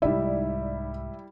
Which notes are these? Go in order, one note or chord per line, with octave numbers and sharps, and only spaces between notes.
C2 G#2 G3 D#4 E4 D5 E5